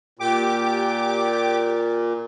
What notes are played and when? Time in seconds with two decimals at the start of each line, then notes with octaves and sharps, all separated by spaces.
0.19 A#2 G4 D6